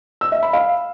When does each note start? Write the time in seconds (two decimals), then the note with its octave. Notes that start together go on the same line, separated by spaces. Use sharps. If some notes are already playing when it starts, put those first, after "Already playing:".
0.21 E6
0.32 E5
0.43 B5
0.53 F5